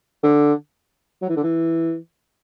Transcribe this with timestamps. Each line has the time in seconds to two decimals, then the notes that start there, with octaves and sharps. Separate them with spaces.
0.23 D3
1.22 F#3
1.29 E3
1.37 D3
1.43 E3